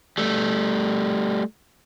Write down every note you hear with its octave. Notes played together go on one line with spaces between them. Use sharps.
G3 A3